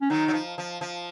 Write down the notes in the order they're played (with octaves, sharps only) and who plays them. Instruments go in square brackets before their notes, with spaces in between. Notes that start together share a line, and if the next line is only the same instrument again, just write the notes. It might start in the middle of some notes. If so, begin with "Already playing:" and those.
[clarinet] C#4
[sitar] D#3 F#3 [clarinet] D#4
[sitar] F#3
F3
F3
F3